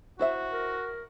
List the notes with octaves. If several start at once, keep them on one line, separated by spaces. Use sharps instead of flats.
E4 F#4 C5 E5
A#4